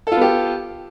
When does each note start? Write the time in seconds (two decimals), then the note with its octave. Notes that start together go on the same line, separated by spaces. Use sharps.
0.07 A4
0.12 F4
0.17 B3
0.21 G4